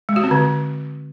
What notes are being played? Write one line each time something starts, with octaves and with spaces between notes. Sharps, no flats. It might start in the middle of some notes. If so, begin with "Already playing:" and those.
G#3
F#4
C4
D3